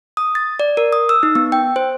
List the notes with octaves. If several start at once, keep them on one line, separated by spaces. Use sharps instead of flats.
D#6
A6
D5
A#4
D#6
E6
D#4
B3
G5
C5